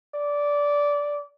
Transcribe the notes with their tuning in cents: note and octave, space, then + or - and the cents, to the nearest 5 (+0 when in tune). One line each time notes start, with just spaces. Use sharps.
D5 -15